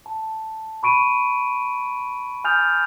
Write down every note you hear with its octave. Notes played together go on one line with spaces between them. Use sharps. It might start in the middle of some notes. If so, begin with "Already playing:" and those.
A5
B5 C#6 D7 D#7
G#5 D#6 F6 G6 A6 F7